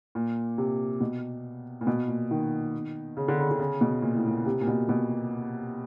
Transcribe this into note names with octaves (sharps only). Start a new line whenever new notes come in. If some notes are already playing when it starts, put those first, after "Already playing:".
A#2
C3
B2
A#2
B2
A#2
D#3
C#3
D3
C#3
D3
C#3
B2
A#2
A2
A#2
C3
A#2
B2
B2